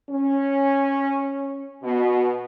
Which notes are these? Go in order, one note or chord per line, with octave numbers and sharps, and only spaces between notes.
C#4
B2